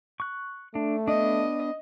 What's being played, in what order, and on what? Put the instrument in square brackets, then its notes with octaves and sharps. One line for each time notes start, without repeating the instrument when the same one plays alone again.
[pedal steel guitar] C#6 F#6
[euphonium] A3 [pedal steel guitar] D4
[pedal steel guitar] B3 D4 [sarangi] D#5